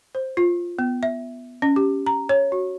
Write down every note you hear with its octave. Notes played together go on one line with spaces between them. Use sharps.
C5
F4
B3
E5
C#4
G4
A#5
C#5
F#4